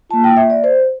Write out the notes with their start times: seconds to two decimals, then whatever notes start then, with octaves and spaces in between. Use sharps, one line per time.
0.10 F4 A5
0.13 A#3
0.24 G5
0.37 E5
0.50 D5
0.64 C5